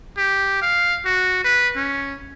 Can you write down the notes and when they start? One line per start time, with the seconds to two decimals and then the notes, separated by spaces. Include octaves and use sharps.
0.17 G4
0.62 F5
1.05 F#4
1.44 B4
1.76 C#4